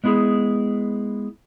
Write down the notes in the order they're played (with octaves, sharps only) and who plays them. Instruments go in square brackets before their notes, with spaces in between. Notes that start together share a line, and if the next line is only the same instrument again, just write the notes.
[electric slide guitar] G#3 B3 E4 G#4